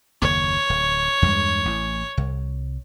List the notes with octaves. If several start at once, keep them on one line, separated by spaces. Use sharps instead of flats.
F#1 D#2 C#5
D1
E2 G2 G#3
A1 A2
C2